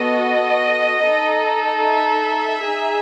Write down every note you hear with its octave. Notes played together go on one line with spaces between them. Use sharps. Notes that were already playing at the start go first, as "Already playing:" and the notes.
Already playing: B3 F#4 A4 D#5
D#4 A4
E5
D#4 G#4